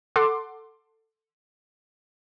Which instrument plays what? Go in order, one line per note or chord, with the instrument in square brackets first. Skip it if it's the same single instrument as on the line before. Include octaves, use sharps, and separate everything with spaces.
[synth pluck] A4 F#5 C6 D6